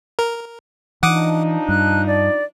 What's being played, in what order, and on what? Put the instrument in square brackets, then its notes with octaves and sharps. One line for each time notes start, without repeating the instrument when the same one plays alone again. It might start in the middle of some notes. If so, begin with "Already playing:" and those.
[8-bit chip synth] A#4
[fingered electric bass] E3 [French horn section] F3 D4 D#4 [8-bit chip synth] F#5 D6 D#6
[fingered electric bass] G2 [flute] F#6
[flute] D5